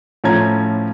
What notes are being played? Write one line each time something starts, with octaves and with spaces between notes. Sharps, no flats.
A2 F3 C#4 A#5 G#6